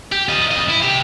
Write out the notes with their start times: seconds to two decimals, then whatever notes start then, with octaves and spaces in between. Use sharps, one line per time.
0.12 G4
0.29 F4 D#5
0.51 F2 D#5
0.69 E4
0.82 C3 G4